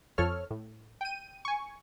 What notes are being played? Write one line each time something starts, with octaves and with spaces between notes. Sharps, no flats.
F2 F3 A4 C#5 F6
A2
G5 D#7
G#5 C#6